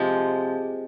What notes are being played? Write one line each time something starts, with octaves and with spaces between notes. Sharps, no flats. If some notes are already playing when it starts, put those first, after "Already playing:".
Already playing: C3 F3 G#3